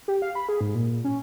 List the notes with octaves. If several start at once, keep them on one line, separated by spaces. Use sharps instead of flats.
G4
F5
B5
G#4
G#2
A#2
A#2
C#4